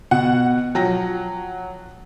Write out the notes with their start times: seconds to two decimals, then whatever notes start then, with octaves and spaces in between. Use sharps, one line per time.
0.11 B2 F#5
0.75 F3 F#3 G5 A#6